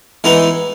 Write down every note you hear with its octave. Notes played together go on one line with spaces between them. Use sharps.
E3 G#3 B3 D#4